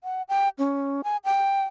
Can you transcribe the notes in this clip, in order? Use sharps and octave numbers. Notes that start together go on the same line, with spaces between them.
F#5
G5
C#4
G#5
G5